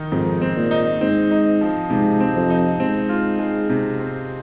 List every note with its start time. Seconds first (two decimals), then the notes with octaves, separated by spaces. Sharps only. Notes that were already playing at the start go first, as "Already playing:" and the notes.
Already playing: D#3 D#4
0.12 F2 G#2
0.41 C4
0.56 A#2
0.71 D#4
1.01 G#2 C4
1.31 D#4
1.61 F3
1.90 G#2 C3
2.20 C4
2.36 F2
2.50 D#4
2.79 G#2 C4
3.09 F4
3.39 G#3
3.69 C3
4.00 C4